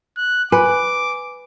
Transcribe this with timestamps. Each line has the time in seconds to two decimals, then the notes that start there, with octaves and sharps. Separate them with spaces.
0.17 F#6
0.52 B4 G#5 D6